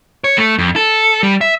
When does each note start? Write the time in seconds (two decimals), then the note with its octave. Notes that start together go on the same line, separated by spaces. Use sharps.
0.24 C#5
0.38 A3
0.59 F2
0.76 A4
1.23 G3
1.41 E5